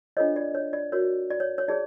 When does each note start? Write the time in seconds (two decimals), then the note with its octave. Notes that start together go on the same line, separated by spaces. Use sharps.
0.17 D4 F4 A4 C5 C#5 D#5
0.36 D5
0.55 C#5
0.73 D5
0.92 F#4 A#4 C#5
1.30 D5
1.40 C#5
1.58 C#5
1.68 D#4 G#4 C#5 D5